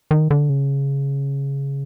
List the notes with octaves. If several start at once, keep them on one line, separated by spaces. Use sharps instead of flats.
D#3
D3
C#3